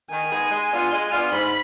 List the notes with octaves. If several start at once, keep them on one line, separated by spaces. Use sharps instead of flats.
D#3 G#5
G#3 B3 D#4 G#4
G#3
B3 D4 F4
G#3
B3 D4 F4
G#2 B5